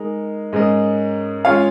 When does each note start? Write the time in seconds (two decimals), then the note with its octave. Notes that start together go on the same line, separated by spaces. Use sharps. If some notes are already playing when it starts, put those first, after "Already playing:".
Already playing: G#3 D#4 A#4
0.53 G#2 G#3 C#4 A#4 D#5
1.45 G#3 C#4 F4 C#5 F5